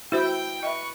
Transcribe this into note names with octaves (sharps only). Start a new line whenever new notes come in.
E4 F#4 C5 G5
B4 D#5 E5 C#6